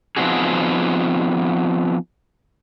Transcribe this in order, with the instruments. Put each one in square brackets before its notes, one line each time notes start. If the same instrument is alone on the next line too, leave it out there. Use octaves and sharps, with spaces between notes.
[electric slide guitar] F3 B3 C4 D#4 F#4 G#4